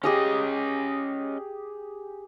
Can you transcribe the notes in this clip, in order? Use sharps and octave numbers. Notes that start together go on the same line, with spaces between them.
C#4 G4 G#4 D#5 G#5